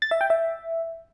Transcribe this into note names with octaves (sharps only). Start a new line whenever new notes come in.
A6
E5
G5
E5